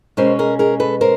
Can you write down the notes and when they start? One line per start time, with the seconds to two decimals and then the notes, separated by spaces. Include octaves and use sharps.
0.17 B2 G#3 C#4 A#4 C5
0.39 G#4 A#4
0.59 G#4 A#4
0.80 A4 B4
1.01 A#4 C5